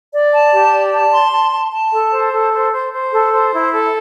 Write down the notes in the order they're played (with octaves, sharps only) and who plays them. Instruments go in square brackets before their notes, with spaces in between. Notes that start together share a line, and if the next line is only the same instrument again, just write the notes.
[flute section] D5
A5
G4
D5
A5
C6
A5
A5
A5
A4
C5
A4
C5
C5
C5
A4
C5
E4
A4